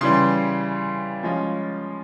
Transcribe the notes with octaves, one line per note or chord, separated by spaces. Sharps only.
C#3 E3 G3 C6
F3 G#3 C#4 F4